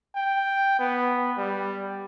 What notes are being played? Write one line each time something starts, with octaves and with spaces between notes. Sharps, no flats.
G5
B3
G3